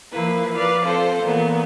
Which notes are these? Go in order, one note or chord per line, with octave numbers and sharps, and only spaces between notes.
F3 A#3 E4 B4
B4 D5 F5
C4 F4 A4 C5
A#2 E3 B3